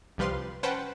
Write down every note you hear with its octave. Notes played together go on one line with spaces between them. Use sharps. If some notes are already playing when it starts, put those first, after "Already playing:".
C2 F3 G3 B4 F5 C6
C#4 B4 C5 F#5 G5 A5